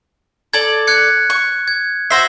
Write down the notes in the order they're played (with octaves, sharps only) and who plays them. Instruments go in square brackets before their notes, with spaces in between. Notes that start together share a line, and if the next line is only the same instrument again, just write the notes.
[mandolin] A4 D5 [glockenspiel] G#6
[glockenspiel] F#6 G#6 C#7
[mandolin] C#6
[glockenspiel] G#6
[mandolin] F#4 C5 E5 [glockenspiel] A#6 C7